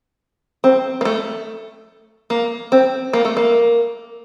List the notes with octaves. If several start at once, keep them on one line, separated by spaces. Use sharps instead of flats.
C4
A#3
A3
A#3
C4
A#3
A3
A#3